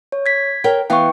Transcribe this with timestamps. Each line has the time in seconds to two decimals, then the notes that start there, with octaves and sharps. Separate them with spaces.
0.12 C#5
0.26 G#6 B6
0.64 A#4 C#5 G5
0.90 E3 B3 F5 G5 C#6